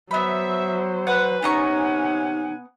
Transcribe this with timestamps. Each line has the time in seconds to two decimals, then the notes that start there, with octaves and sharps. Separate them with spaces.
0.11 F#3 B3 C5 E5 B5
1.07 B4 F#5
1.42 C3 B3 C#4 D#4 F#5 G#5 A#5 C#6